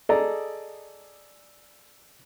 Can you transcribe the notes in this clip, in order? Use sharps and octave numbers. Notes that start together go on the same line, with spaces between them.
G#4 A4 D5 D#5 A#5